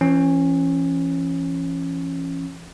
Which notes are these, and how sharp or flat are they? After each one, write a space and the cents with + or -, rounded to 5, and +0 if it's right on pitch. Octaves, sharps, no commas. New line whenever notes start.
E3 +35 C#4 -20